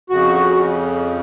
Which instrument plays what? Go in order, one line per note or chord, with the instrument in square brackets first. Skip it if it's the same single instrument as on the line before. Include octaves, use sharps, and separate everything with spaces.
[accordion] F2 C#3 F#4